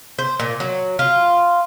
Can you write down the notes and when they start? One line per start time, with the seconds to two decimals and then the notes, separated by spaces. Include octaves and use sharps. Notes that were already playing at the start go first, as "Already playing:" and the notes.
0.18 C5
0.40 A#2
0.60 F#3
0.99 F4